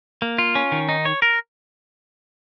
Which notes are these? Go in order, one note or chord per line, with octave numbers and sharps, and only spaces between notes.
A#3
F4
C#4
D#3
D#4
C#5
A#4